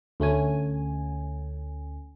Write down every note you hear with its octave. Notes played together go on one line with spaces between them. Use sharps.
D2 A3 C#4 G#5